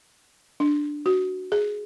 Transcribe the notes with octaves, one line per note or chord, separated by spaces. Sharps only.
D4
F#4
G#4